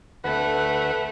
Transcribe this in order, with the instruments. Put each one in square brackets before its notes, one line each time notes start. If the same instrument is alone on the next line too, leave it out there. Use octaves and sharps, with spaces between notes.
[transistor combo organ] D2 B4 F#5 [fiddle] A3